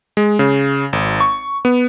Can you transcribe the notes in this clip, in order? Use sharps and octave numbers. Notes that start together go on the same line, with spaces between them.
G#3
C#3
G#1
C#6
B3